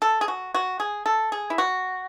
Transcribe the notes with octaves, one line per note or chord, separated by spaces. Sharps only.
A4
G#4
F#4
F#4
G#4
A4
G#4
E4
F#4